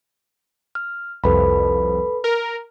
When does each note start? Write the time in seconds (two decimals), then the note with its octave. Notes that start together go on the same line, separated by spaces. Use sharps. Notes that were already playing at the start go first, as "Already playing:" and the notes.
0.75 F6
1.24 C2 F2 A4 B4 B5
2.24 A#4